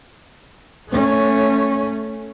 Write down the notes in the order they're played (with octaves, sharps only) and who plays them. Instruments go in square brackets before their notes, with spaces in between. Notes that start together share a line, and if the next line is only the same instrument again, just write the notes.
[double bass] A3 C#4